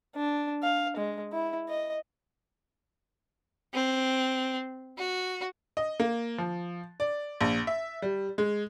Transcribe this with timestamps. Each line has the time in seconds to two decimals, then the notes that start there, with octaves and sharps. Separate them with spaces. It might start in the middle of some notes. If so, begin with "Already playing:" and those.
0.16 D4
0.63 F5
0.97 G#3
1.32 E4
1.69 D#5
3.74 C4
4.98 F#4
5.77 D#5
6.00 A#3
6.38 F3
7.00 D5
7.41 A#1
7.67 E5
8.02 G3
8.38 G#3